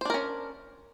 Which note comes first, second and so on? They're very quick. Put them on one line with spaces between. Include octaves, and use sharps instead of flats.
C5 D4 A#4 C#4